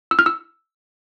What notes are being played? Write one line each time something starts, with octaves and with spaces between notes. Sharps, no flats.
E6
F6
E6